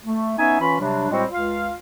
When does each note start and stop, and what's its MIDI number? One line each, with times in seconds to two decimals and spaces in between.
0.04 0.35 57
0.38 0.60 59
0.38 0.60 61
0.38 0.60 63
0.38 0.60 76
0.38 0.60 80
0.60 0.79 52
0.60 0.79 61
0.60 0.79 65
0.60 0.79 83
0.79 1.08 48
0.79 1.08 54
0.79 1.08 55
0.79 1.08 62
1.10 1.24 45
1.10 1.24 55
1.10 1.24 56
1.10 1.24 60
1.10 1.24 66
1.10 1.24 72
1.30 1.73 37
1.30 1.73 65
1.30 1.73 77